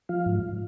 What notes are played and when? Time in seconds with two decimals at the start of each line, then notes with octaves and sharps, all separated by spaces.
0.09 F3 F5
0.26 G#2